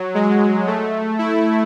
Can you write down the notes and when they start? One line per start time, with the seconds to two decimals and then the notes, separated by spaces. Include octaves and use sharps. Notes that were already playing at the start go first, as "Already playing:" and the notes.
Already playing: F#3
0.15 G#3
0.67 A3
1.19 E4